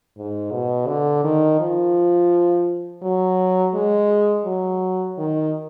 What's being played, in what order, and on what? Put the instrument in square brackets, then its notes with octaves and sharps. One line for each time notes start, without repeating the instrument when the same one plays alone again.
[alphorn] G#2
B2
D3
D#3
F3
F#3
G#3
F#3
D#3